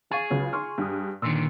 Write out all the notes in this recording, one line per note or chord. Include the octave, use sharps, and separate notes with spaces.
G#4 F5 C#6 A6
C#2 C#3 F#3
C6 C#6 F6
G2 D#6
A#2 D3 D#3 C6 E6